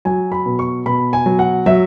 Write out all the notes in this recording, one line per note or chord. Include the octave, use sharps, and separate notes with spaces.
F#3 G#5
B5
B2
C#6
B2 B5
G#5
F#3
F#5
F#3 E5